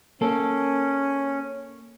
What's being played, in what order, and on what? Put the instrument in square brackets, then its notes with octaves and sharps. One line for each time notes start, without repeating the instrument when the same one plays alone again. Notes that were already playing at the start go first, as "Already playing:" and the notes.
[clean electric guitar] A#3 A4 [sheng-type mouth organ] C#4